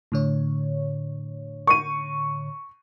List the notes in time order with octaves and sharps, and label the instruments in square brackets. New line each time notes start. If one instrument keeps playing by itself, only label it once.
[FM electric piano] A2 D3 C#5
[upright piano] C#6 D#7